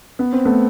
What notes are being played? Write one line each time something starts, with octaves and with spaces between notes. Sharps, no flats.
B3
C4
A3 B3